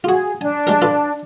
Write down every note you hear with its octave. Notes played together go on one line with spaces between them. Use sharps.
F4 F#4 G#4
D4 G#5
G#3 G4 A#4
F4 A4 B4